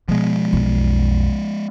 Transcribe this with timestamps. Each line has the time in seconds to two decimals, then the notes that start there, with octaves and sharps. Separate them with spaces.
0.08 B2 F3 G#3
0.53 B1 F2